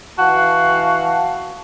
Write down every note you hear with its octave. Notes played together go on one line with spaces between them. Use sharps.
E3 F#4 F5 A5